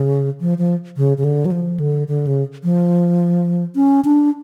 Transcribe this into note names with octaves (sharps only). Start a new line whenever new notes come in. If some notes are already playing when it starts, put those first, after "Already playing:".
Already playing: C#3
F3
F3
C#3
C#3
D3
F#3
F3
D3
D3
C#3
F3
C#4
D4